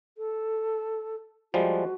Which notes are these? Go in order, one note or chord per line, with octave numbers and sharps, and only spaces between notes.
A4
F3 G3 G#3 F#4